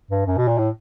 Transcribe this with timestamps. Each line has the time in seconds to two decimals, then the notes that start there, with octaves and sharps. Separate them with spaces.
0.11 G2
0.26 F#2
0.37 B2
0.48 A#2
0.58 A2